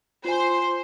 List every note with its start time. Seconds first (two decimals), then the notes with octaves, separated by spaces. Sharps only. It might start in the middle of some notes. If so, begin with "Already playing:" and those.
0.25 F4 C5 G#5